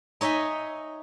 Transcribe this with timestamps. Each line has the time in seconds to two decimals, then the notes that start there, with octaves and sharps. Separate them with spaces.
0.21 D#4 C#5 D#5 E5 G#5